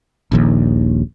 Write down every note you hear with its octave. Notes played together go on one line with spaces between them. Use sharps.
D#1 A#1 D#2